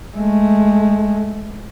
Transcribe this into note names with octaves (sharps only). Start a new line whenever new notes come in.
G#3 A3